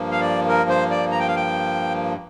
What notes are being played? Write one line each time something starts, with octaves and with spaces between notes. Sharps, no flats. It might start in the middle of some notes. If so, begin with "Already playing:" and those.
Already playing: G2 F3 A#3
F5
D5
A#4
C5
D5
A#5
G5
F5
G5